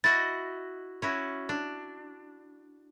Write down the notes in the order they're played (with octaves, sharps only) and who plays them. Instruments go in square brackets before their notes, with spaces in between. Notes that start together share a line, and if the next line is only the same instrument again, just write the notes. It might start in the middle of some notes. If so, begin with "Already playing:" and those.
[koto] E4 F#4 D#5 [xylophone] A6
[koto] C#4 E4 F#4
D4